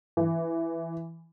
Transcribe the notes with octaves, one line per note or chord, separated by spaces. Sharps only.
E3